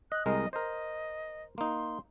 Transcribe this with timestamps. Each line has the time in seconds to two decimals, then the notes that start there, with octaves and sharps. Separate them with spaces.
0.12 D#5 F#6
0.26 C2 G#3 A#4 D#5
0.53 A#4 C5 D#5
1.58 A#3 D#4 C6